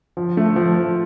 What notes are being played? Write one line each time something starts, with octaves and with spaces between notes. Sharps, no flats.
F3
A3
F3
F3